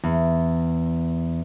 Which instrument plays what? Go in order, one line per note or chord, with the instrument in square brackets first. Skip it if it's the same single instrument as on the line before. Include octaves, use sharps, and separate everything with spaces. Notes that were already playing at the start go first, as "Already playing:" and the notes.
[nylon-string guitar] E2